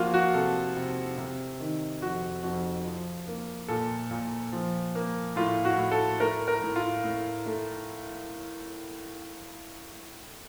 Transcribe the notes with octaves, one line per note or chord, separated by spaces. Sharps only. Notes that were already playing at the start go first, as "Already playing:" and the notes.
Already playing: F3 A#3 F4 F#4
F#4
C3 A4
C3
C3
D#3
F2 F#4
F2 F#4
F3
A#3
A#2 A4
A#2
F3
A#3
A2 F4
F#4
A2
A4
A3 A#4
A#4
A2
F4
A2
A3